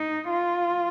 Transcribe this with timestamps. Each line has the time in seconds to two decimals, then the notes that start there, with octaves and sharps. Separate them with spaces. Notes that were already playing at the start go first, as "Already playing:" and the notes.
Already playing: D#4
0.30 F4